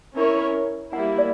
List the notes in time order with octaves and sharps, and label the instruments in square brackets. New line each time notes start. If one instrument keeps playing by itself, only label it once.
[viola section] C#4 E4 A#4 C#5
[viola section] G3 A#3 E4 [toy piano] F#5
[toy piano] D5